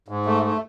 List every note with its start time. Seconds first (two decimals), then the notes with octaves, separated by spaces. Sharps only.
0.08 G#2
0.26 A3
0.43 A3